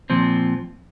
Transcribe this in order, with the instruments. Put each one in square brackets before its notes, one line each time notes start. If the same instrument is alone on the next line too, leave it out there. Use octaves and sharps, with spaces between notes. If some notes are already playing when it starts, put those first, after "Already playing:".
[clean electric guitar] A#2 F3 C4